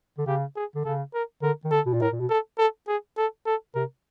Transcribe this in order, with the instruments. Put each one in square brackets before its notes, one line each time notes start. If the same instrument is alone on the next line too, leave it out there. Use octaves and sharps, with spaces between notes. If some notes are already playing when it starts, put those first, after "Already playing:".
[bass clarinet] D3
[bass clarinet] C#3 [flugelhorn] G4
[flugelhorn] G#4
[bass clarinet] D3
[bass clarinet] C#3 [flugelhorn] A4
[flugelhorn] A#4
[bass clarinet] D3 [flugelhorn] A#4
[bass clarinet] D#3
[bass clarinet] D3 [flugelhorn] A4
[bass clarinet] B2
A#2
[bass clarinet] A2 [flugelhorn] A#4
[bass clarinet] A#2
B2
[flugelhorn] A4
A4
G#4
A4
A4
[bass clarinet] C3 [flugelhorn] A#4